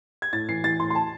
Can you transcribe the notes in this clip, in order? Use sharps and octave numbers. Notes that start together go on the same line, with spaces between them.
G#6
A2 A6
E3 C7
E3 A6
A2 C6
C6
A5